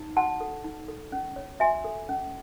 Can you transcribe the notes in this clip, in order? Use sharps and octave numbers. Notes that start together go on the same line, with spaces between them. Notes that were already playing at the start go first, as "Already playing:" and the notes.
Already playing: D#4
F#4 F#5 A5
A4
D#4
A4
C#4
C#5
F#4 E5 G#5
A4
C#4